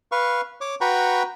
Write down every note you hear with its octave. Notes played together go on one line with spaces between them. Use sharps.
B4 F5 C#6
C#5 D6
F#4 B4 G5 A#5 B5 C#6